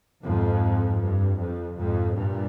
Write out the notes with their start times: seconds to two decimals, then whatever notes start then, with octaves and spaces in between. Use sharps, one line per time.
0.23 F2 G#2
1.00 G2
1.38 F2
1.76 F2 G#2
2.14 G2 A#2